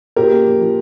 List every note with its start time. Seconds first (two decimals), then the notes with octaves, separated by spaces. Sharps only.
0.16 A#2 G4 A#4
0.31 A#3
0.46 F3
0.61 F3